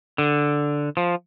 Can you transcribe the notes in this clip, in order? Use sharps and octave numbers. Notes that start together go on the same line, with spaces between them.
D3
F3